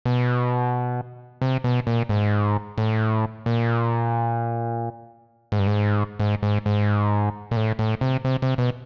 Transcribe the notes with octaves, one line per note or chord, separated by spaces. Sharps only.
B2
C3
B2
A#2
G#2
A2
A#2
G#2
G2
G#2
G#2
G#2
G#2
A#2
A2
A2
C3
C3
C3
B2